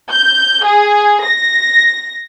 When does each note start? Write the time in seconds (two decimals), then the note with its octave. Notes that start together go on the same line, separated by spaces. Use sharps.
0.10 G6
0.64 G#4
1.24 A#6